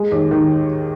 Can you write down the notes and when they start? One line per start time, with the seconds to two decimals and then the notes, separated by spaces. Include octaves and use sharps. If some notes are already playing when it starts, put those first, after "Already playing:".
Already playing: G#3
0.12 D#2
0.31 D#3